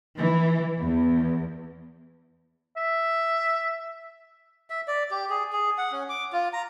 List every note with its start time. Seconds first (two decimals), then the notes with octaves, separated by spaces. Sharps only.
0.17 E3
0.78 E2
2.77 E5
4.70 E5
4.88 D5
5.11 G4
5.30 G#4
5.52 G#4
5.78 F#5
5.92 C#4
6.09 D6
6.33 F4
6.53 A#5